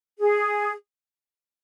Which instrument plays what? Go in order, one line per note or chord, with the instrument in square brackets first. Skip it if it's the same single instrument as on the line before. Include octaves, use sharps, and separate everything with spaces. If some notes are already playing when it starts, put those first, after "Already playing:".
[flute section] G#4